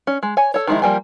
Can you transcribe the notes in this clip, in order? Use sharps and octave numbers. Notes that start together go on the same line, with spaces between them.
C#4
G#3
C#5 G#5
A4 C#5
D#3 F3 G#3 D#4 E4
F3 G3 A#3 G4 G#5